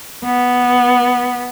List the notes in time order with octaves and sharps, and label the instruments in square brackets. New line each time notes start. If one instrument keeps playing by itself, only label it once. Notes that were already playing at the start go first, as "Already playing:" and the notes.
[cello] B3